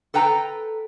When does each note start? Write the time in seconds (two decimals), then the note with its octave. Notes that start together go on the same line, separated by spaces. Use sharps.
0.14 A4 B4 G5 A#5